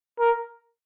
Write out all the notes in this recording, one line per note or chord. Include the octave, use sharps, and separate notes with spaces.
A#4